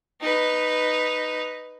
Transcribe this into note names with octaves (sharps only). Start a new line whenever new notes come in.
D#4 B4